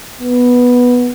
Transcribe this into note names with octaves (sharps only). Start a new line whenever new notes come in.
B3